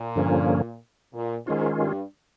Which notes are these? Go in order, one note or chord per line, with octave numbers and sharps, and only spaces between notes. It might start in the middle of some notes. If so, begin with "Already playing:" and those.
Already playing: A#2
G2 D3 F3 A#3 C#4
A#2
G#2 D#3 G#3 C#4 F4
G2